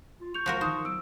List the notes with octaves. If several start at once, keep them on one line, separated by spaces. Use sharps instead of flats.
F4
C#6 G6 F7
C#2 F3 F#4 A#4
D3 D#3 D#4 C5 D#6
F#3 E6 D7